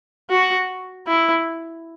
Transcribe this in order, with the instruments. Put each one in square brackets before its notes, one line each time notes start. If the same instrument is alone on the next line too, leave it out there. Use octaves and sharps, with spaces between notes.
[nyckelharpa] F#4
E4